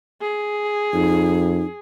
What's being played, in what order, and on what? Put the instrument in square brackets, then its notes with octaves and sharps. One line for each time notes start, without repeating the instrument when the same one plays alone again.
[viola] G#4
[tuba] F2 [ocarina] D#4